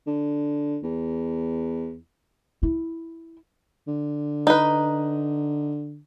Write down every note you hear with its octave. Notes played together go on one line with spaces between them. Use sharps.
D3
E2
E4
D3
D#4 B4